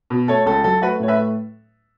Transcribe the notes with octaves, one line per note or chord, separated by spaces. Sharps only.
B2
A3 A4 C#5
C#2 A4
F#3 A4
A3 F#4 B4
A2 C#5
B4 E5
A3